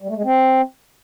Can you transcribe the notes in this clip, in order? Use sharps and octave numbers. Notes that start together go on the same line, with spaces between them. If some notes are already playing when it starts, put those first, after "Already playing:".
G3
A3
G#3
C4